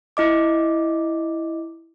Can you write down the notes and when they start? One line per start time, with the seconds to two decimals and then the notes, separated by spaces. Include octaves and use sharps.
0.17 E4 D#5 D6